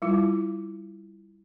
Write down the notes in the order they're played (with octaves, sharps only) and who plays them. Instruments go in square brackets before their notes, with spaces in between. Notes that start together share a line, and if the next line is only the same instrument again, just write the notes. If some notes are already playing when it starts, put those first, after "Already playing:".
[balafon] G3 E4 F4